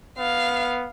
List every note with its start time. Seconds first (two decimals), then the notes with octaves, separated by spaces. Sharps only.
0.18 B3 F5